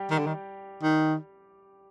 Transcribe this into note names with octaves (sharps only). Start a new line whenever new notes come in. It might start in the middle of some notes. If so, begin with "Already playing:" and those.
Already playing: G3 G4
D#3
D3
D#3
D#3